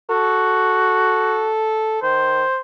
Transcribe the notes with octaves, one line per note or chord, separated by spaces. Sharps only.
F#4 A4
D#3 C5